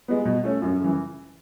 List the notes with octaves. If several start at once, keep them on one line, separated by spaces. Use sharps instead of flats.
G#3 B3
B2
A3 C#4
F#2
C#3 E3